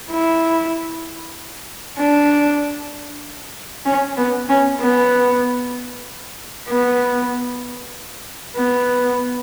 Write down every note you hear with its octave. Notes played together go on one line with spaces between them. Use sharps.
E4
D4
C#4
B3
C#4
B3
B3
B3